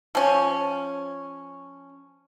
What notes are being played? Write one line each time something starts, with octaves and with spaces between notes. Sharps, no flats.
F3 C#4